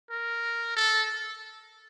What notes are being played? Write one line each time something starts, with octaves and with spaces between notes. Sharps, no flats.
A#4
A4